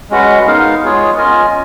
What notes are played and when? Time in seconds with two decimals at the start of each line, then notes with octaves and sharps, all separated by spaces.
0.10 G#3 C#4 F#4 B4 F#5
0.46 G#3 B3 D#4 A#4 F5
0.82 G#3 B3 F4 G#4 C#5
1.17 C#4 F4 A#4 D#5 G#5